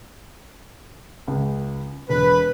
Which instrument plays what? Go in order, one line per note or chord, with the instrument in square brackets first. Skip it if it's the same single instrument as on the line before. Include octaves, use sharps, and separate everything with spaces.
[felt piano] C#2
[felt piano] E1 [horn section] B4